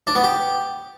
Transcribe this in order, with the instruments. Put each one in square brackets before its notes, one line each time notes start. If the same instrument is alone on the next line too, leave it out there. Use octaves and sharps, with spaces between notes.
[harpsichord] D4
B3
G4